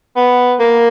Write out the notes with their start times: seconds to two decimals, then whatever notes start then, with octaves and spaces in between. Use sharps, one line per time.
0.16 B3
0.60 A#3